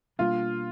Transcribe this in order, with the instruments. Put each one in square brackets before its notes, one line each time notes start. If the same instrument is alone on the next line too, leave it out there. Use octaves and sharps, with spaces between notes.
[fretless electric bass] B2 G3 A#3 D4 [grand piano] F4